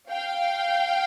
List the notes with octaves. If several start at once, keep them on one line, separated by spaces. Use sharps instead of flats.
F5 G5